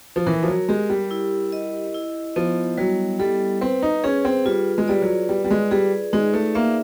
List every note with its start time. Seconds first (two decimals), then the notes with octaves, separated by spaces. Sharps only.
0.16 F3
0.27 E3 A#4
0.43 F3
0.48 F#3
0.69 G#3 G4
0.90 G3
1.11 E4
1.52 D#5
1.94 E4
2.36 F3 B3
2.78 F#3 G3
3.19 G3 A4
3.61 C4 B4
3.82 D#4
4.04 C#4 G#4
4.25 C4
4.45 G3 F4
4.78 G#3
4.88 G3 D5
5.02 F#3
5.29 G3 B4
5.44 G3
5.51 G#3
5.71 G3 G#4
6.13 G#3 D#4
6.34 A3
6.55 A#3 E5